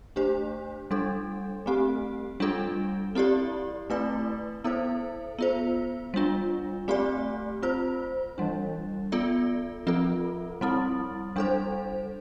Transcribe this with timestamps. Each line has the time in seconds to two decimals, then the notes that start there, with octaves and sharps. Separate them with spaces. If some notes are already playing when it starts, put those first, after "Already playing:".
0.16 A3 D4 G4 C5
0.91 G3 D4 A4
1.66 A3 C4 G4
2.40 G3 D4 F4 A4
3.15 C4 E4 G4 D5
3.90 A3 C4 E4 B4 D5
4.64 B3 E4 A4 C5
5.39 B3 F4 C5
6.14 G3 D4 F4
6.88 A3 C4 G4 D5
7.62 C4 F4 C5
8.38 E3 G3 D4
9.12 B3 F4 A4 D5
9.87 F3 C4 F4 A4
10.61 G3 C4 E4
11.36 G3 D4 A4 C5